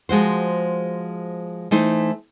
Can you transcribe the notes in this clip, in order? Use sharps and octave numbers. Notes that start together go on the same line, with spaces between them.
F3 G#3 F#4 C5
E3 A3 D#4 C5